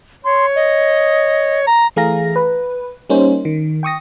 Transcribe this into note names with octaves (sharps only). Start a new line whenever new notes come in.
C#5 C6
D#5
A#5
E3 A3 G#4 F5 A#5 A#6
B4
G3 A#3 C#4 D#4 C5
D#3
G5 C#6 D#6 A#6